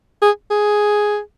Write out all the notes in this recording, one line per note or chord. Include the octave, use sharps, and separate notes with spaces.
G#4
G#4